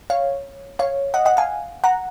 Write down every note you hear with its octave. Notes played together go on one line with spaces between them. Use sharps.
C#5 F5
C#5 F5
D#5 F#5
D#5 F#5
F5 G#5
F#5 A#5